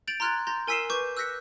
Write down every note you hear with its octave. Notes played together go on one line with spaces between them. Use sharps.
G6 A6 D7 F7 F#7
A#5 C6 F6 F#6 G#6 A6
A#5 C6 G6 A6 A#6
A#4 G#5 E6 B6 C7 E7
B4 C#6 D6 G6
E6 F#6 G6 A#6 B6 C#7